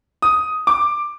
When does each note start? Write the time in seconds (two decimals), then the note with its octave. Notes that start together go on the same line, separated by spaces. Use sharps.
0.22 D#6
0.67 D6